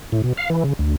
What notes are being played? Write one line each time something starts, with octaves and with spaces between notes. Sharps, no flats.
A2
B2
F5
E3
C#3
D2